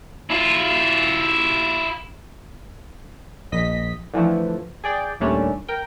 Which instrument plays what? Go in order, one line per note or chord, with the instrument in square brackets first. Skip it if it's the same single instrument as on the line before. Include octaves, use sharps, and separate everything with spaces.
[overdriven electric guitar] E4 F4
[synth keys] A#1 D#5 B6
D3 E3 F3 A3
G#4 D5 G5
D#2 A#2 G3 A3 C#4 D4
A#4 G5